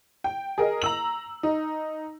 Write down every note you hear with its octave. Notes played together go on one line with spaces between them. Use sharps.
G5
G#4 A#4 D#5
A#5 E6 F#7
D#4